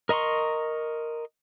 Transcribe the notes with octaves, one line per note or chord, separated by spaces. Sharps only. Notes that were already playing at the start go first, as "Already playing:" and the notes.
A#4 D#5 A#5 C6 C#6